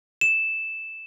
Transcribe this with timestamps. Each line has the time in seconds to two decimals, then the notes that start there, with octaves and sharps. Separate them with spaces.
0.21 E7